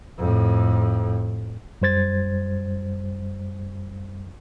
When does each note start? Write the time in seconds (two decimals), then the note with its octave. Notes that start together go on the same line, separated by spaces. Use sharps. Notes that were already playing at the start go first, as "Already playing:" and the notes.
0.19 F2 A2
1.82 F#2 G3 C5 G#6 A6